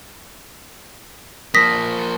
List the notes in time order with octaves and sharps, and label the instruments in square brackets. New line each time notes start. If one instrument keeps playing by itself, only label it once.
[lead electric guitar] F3 A#3 [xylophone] D#6 A#6 B6